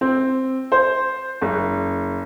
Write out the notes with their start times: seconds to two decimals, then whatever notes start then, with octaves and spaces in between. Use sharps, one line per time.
0.01 C4
0.72 C5
1.41 F#1